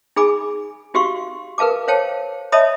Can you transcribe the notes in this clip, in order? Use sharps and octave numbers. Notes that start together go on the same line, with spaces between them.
D#4 G#4 G#5 B5 D6
D#4 F#4 G4 F5 C6 C#6
A#4 B4 F5 A5 D6
C5 C#5 F5 G5 A5
C#5 D#5 E5 A5 B5 D#6